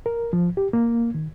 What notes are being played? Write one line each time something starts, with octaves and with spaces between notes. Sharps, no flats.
A#4
F3
G4
A#3
D#3